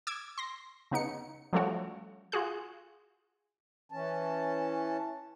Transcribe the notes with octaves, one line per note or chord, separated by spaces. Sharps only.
D6 E6 G#6
C6 A#6
C#3 B3 D#4 C#7
F3 G3 A3 C#4 F4 F#4
F4 F#4 G#4 F#6
E3 C#4 A5